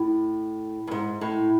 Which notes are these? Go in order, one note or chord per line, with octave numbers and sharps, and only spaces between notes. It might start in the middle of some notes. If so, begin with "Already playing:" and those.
Already playing: A2
G2
G#2
A2